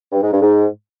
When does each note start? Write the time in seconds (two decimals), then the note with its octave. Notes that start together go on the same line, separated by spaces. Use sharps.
0.12 G2
0.22 G#2
0.32 G2
0.42 G#2